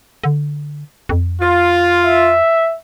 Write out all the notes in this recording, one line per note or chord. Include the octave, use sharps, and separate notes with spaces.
D3
F2
F4
E5